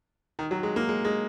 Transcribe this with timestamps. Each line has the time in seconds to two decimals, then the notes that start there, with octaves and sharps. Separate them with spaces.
0.39 D#3
0.51 F#3
0.63 G#3
0.76 A#3
0.89 G#3
1.05 G#3